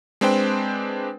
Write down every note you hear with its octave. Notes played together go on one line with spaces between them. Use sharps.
G#3 C4 D4 B4 C5 G5